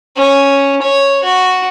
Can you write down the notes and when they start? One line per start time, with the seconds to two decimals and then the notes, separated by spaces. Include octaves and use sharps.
0.16 C#4
0.82 C#5
1.23 F#4